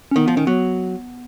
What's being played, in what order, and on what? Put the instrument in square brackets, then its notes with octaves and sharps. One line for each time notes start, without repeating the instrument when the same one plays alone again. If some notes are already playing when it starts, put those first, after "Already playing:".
[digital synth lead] C#4
[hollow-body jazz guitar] D#3 [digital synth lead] B3
[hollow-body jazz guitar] F3 [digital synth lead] B3
[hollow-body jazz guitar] D#3 [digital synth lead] C#4
[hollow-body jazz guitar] F#3 [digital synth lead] B3